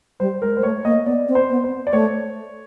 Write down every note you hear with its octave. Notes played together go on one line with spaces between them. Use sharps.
G3 C5
G#3 A#4
G#3 C5
A3 C#5
A#3 D#5
B3 D5
C4
C5
B3
C5
D5
A3 C#5